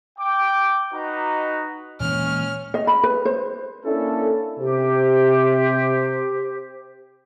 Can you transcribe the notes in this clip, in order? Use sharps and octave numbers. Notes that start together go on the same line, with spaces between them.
G5 D6
D#4 F#4 B4 D#5 A#5
A#2 E3 G#3 C#4 F6
D#5
B5
B4
C5
A#3 C#4 D4 E4 A4
C3 G4 C5